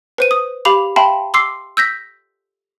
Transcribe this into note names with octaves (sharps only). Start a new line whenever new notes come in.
B4 C5 D#7
D#6
G4 F5 B5 D6 F7
E5 F5 G5 A5 B5 C6
C6 D6 E6 C7
E6 G6 A#6 B6